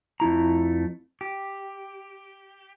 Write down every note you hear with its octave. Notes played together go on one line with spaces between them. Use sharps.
F2 A3 E4 A#5
G4